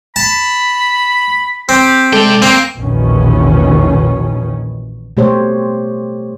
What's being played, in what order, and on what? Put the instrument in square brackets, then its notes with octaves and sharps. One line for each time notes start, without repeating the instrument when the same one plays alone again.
[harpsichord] A5 [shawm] B5
[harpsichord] C4 [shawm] G4
[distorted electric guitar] C3 G5 [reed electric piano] G#3 A4 [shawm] D5
[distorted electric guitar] A#3 [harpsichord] C4
[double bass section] A#1 E2 B2 D#3 C#4
[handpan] B2 A3 G4 C5 C#5